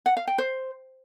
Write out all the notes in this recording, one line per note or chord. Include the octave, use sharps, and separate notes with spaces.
F#5
F5
G5
C5